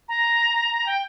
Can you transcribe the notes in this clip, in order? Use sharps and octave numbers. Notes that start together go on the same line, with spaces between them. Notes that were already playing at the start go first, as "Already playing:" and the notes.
A#5
G5